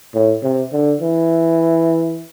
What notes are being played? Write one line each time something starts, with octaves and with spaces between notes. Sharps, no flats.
A2
C3
D3
E3